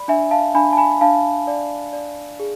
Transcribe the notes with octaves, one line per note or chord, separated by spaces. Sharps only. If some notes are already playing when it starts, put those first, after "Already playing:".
Already playing: D5 B5
D4 E5 G#5
F5 A5
D4 G#5 B5
A5
G#5 B5
D4 F5 A5
D5
D5
G#4